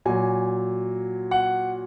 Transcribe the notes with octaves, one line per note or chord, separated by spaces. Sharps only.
A#2 F#3 G#5
F#5